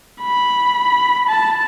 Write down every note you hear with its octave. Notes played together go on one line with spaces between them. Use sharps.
B5
A5